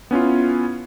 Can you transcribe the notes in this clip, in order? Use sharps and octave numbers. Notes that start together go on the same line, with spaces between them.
B3 C#4 E4 F4